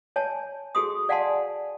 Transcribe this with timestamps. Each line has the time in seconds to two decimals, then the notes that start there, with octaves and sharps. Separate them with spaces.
0.16 C#5 G#5 A5
0.75 F#4 G#4 A4 C6 D#6
1.09 D5 F5 F#5 G#5 A5 C6